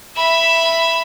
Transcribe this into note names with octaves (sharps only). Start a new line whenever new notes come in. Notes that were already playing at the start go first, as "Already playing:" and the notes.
E5 B5